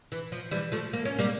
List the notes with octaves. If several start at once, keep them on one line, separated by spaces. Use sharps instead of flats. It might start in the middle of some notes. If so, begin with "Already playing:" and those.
E3
F3
E3 G3
F3 A3
A#3
C#4
G3 A#3